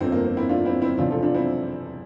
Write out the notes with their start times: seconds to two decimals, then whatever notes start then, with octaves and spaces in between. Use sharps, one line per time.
0.01 G1 F2 D3 F3 C4
0.12 A#3
0.24 C4
0.37 C4 E4
0.49 D4 F4
0.65 C4 E4
0.82 C4 E4
0.98 E1 E2 C3 F3 D4 F4
1.10 F4 A4
1.23 D4 F4
1.34 C4 E4